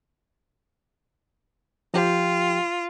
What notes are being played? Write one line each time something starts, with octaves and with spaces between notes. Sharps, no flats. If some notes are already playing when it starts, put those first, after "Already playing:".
F3 F4 G4 G5